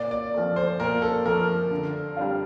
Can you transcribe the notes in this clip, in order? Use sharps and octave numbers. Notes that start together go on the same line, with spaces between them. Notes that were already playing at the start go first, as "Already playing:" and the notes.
Already playing: A#2 D5
D5
F3 A3
C5
A#2 A#4
A4
F3 A3 A#4
D3
G3 D4 F4